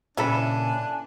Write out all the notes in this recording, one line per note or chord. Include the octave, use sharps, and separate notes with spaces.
A#2 C#3 E3 D4 A4 G#5 B5